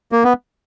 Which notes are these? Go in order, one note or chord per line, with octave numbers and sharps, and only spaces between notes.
A#3
B3